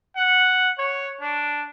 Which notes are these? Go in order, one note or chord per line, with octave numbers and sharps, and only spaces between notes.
F#5
C#5
D4